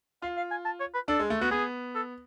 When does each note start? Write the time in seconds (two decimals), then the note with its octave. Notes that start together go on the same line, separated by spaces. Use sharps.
0.22 F4 F5
0.37 F5
0.51 G#5
0.65 A5
0.80 C#5
0.94 B4
1.08 D4 A4
1.19 G#3
1.30 A3
1.41 B3 F#4
1.51 B3 G#4
1.95 A4